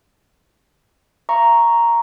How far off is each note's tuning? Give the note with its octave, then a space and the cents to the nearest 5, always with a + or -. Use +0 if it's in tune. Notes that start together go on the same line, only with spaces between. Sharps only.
F5 -40 A#5 +0 C#6 +0